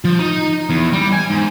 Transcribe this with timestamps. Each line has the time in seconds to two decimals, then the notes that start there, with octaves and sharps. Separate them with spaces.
0.05 F3
0.19 D#4
0.70 E2
0.93 G3
1.13 G#5
1.30 G#2